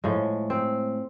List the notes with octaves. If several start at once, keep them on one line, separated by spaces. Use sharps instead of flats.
A2 F3 G#3
C4